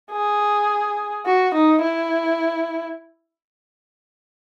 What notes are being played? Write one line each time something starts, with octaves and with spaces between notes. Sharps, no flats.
G#4
F#4
D#4
E4